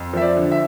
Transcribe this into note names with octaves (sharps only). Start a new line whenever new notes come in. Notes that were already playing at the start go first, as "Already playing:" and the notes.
Already playing: F2
F3 E5
D5
D3
E5